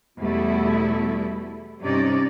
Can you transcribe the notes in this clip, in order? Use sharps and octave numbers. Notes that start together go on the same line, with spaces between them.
E2 B2 G3 A3 E4
G2 C3 C#4 D#4 D5